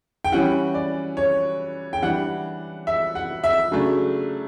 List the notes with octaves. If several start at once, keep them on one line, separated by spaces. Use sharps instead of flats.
G5
E3 G3 C#4 E4 F#5
D5
C#5
G5
E3 G3 D4 F#5
E5
F#5
E5
C#3 F#3 A3 D4